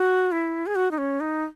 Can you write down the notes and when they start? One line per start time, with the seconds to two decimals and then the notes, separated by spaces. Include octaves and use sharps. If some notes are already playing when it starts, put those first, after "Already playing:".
Already playing: F#4
0.32 E4
0.67 G#4
0.75 F#4
0.91 D#4
0.98 C#4
1.20 D#4